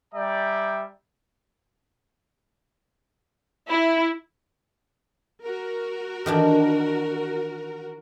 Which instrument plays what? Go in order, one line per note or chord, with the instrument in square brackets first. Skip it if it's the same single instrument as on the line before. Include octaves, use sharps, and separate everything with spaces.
[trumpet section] G3 D5 E5 G5 G#5 A#5
[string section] E4
[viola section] F#4 A#4
[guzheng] D#3 E3 D4